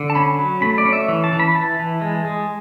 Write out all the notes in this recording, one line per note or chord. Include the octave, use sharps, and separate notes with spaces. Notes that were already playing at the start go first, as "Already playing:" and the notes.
Already playing: D3
A5
C#4 B5
F#3
A3 B5
D5
C#4
E5
E3
A5
E3
B5
E3 A5
E3
G#3
G#3